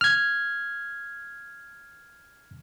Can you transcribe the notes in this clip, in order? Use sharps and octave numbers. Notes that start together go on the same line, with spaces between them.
F6 G#6